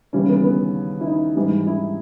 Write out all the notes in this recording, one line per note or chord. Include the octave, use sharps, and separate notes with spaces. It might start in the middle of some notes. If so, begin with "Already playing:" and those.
D#2 C#3 E3 G3 C#4
B3
B3
E4
D#4
G#2 E3 G3
E4